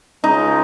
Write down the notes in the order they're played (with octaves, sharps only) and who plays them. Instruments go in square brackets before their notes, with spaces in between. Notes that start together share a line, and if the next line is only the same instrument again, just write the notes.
[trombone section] C#2 C#3 G#3 [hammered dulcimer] D#4